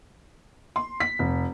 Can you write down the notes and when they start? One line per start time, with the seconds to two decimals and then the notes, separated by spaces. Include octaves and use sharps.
0.76 C6
1.00 B6
1.19 F1